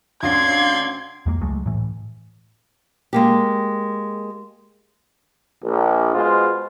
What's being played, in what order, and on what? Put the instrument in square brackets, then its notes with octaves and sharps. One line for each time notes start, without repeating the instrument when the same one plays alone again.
[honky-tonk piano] D2 C#4 [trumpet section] C4 D5 C6 [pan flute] F5 [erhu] G#6
[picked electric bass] E2 G#3 A#3
C#2 F#3 G#3 A3
A2 E3
[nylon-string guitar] G#3 A#3 G4
[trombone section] A#1
B2 G#3 F4 C5